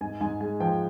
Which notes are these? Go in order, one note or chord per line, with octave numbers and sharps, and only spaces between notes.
G#2 G#5
G#2 G#5
G#3 G#5
F3 G5